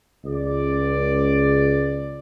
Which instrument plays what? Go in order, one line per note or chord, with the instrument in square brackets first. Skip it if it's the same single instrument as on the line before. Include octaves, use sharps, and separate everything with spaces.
[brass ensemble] C#2 D5